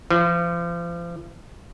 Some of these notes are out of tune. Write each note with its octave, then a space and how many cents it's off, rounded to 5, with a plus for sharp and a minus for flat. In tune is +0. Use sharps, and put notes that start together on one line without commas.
F3 -35